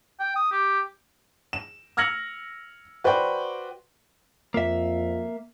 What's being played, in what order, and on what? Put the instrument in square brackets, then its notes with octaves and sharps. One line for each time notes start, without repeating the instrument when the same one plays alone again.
[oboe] G5
D#6
G4
[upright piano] E7
E6 F6 G#6 A#6 C#7 F#7
F#4 B4 C5 D5 G5
[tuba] F2 [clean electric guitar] A#3 E5